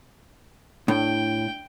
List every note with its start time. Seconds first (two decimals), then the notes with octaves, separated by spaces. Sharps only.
0.88 A2 D4 G5